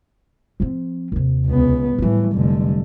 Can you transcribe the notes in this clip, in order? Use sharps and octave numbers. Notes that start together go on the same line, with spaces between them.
F3 C4
D#2 C3
C#2 B3
A2 E3 F#3 G3
F1 D3